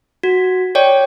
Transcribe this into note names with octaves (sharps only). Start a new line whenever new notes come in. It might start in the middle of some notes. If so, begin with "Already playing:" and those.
F#4
C#5 D5 G5